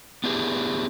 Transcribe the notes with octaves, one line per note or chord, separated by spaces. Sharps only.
B3 D4 E4 G4 G#4